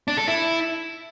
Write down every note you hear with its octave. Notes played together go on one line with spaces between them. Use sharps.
D4
A4
E4